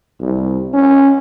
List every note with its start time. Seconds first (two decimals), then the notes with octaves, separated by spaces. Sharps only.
0.21 C2
0.74 C#4